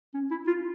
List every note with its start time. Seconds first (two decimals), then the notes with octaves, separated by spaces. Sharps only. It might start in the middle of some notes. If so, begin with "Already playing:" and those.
0.14 C#4
0.31 E4
0.48 F4